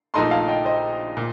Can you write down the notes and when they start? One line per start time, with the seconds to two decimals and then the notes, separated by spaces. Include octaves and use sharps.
0.14 A#1 A#2 A3 D#4 A#4 A5 C6
0.31 F5 A5
0.48 D#5 G5
0.65 C5 D#5
1.17 A#2